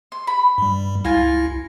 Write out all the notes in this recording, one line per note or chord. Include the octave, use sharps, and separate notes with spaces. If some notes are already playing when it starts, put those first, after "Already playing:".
C6
B5
G2 G3
C#2 E4 F4 G#5 A#6